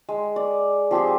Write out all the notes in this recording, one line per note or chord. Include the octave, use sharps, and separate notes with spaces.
G#3
D5
F3 C4 G4 G#4